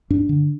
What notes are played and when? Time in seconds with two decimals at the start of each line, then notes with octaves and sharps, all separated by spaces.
0.10 G2 D4
0.29 D3